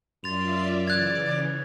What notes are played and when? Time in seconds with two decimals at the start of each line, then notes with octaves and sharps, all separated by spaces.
0.24 F#2 F4 D5 E5 C6 A6 F7
0.87 C#3 E3 D5 F#6 G#6